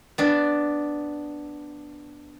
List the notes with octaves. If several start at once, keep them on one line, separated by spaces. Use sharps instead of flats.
B3 D4